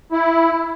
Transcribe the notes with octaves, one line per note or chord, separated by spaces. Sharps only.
E4